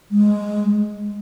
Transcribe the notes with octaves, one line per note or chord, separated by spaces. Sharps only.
G#3